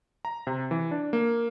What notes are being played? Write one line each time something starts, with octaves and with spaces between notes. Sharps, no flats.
A#5
C3
E3
D4
A#3